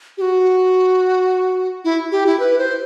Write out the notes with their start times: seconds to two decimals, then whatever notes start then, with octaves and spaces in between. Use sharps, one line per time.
0.18 G4
0.21 F#4
1.85 E4
2.12 G4
2.26 E4
2.40 B4
2.58 C5